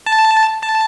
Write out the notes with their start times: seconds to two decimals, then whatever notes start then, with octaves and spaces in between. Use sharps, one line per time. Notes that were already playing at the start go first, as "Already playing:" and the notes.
0.06 A5
0.63 A5